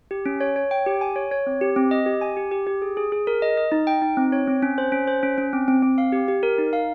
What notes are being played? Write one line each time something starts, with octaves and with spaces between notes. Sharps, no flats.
G4
C#4
C#5
C#5
G5
G4
G#5
C#5
C#5
C4
G4
C4
D#5
G4
G#5
G4
G4
G4
G#4
G#4
G#4
A#4
D#5
D#5
D#4
G5
D#4
C4
C#5
C4
C#4
C5
C#4
C5
C#4
C#4
C4
C4
C4
F5
G4
G4
A#4
D#4
F5